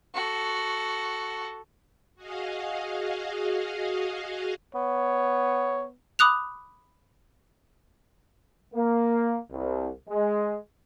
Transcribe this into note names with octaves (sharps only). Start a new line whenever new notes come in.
F#4 A4
F#4 G#4 D#5 F5
B3 C#5
B5 D6 D#6 F#6 F7
A#3
C2
G#3